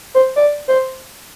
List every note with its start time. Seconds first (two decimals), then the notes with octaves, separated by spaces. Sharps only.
0.15 C5
0.36 D5
0.68 C5